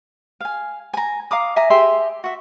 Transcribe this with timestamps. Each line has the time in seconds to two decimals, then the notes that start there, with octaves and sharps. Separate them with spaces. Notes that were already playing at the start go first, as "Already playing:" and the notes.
0.41 F5 G#5
0.93 G#5 A#5
1.31 F5 A#5 D6 D#6
1.56 E5 G#5 A#5
1.70 G4 G#4 E5 C6
2.24 F#4 E5